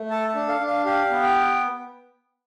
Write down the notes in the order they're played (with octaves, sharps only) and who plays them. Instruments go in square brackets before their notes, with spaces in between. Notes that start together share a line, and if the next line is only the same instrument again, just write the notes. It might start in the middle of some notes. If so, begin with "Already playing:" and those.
Already playing: [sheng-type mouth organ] A3
A4 A5
A5
D4
F5
D4
F5
G4 F5
B3
G5